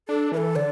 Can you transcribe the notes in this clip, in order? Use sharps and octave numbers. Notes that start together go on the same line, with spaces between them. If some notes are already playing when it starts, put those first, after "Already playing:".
D4 A4
E3 B4
A4
D3 D5